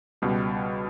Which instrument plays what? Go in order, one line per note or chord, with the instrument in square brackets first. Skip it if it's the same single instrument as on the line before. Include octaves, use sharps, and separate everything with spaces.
[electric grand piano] C#2 B2 G3